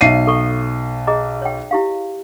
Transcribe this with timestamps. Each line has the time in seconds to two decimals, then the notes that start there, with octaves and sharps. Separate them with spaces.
0.01 B1 C#5 E5 F5 C7 D#7
0.27 A4 C#6
1.07 G#4 D#5 A#5
1.42 C#5 G5
1.71 E4 G4 F5